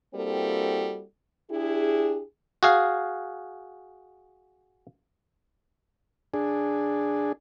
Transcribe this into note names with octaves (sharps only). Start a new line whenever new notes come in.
G3 A#3 C4 E4 F#4 A4
D4 E4 G4 G#4
F#4 G#4 F5
D4 G#4